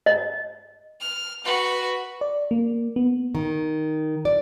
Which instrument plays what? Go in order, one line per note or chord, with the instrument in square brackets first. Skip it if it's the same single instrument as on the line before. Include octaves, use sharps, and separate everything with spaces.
[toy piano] D#5
[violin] F6
F#4 B4
[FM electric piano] D5
A#3
B3
[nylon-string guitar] D#3
D5